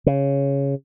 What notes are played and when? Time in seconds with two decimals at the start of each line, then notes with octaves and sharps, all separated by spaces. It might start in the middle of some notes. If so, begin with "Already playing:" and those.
0.06 C#3